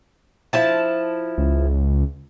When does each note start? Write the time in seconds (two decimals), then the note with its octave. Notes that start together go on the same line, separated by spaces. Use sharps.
0.53 F3 E4 A5
1.38 C#2